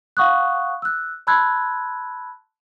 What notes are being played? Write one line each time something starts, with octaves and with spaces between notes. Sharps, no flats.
F5 F#5 C#6 D#6 F#6
E6 F#6
A5 B5 C6 E6 F#6 G#6